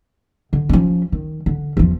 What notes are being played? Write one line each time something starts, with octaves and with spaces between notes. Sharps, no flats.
D3
F3 C#4
D#3
D3
E2 F3